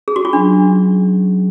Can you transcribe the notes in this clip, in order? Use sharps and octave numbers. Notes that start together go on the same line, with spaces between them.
G#4
F#4
F4
F#3 C#4 D4 G#4